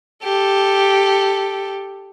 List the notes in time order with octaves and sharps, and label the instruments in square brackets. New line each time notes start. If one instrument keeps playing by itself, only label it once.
[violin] G4 A4